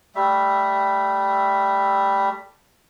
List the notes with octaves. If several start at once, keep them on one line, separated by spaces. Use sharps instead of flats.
G3 A3 E5